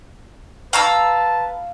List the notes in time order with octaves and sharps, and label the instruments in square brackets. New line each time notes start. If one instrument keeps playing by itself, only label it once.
[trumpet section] B4 A5 [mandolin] F5 A#5 E6